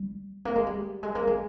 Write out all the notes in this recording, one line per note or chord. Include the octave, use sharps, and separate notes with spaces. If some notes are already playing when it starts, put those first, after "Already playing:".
Already playing: G3
A#3
G#3
G3
G#3
A#3
G#3